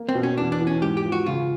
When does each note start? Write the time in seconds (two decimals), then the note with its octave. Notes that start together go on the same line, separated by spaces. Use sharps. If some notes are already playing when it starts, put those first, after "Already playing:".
Already playing: A#3
0.09 C4
0.15 B2
0.23 C#4
0.38 E2 D4
0.52 D4
0.60 E3
0.67 C#4
0.82 G#2 G4
0.97 G4
1.05 F3
1.12 F#4
1.26 C#3 F4